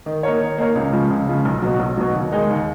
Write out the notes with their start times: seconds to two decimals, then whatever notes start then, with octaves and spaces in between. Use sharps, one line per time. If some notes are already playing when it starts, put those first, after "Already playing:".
0.06 D#3
0.23 A#3 D#4 A#4 C#5
0.40 D#3
0.58 A#3 D#4 A#4 C#5
0.75 C#2
0.93 C#3 F3 G#3
1.11 C#2
1.27 C#3 F3 G#3
1.45 B1
1.62 B2 F#3
1.80 B1
1.97 B2 F#3
2.15 D#2
2.31 D#3 G#3 D#4 G#4
2.49 D#2